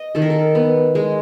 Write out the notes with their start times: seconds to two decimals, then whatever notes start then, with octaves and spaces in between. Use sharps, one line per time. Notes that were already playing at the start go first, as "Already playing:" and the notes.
Already playing: D#5
0.15 D#3 A4
0.22 A#4
0.30 A4
0.55 B3
0.95 G#3